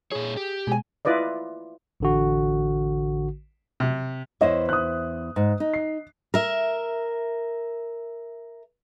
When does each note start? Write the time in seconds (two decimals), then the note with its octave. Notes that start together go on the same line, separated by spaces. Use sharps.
0.11 A#2 G#4 C#5
0.37 G4
0.67 B2 G#3 G#4 G#5
1.05 E4 F4 B4 D5 D#5
2.00 A1 D3 F#4
3.80 C3
4.41 E2 E4 C5 C#5 D#5
4.69 D#6 F#6
5.36 G#2
5.60 D#4
5.74 C7
6.34 A#4 E5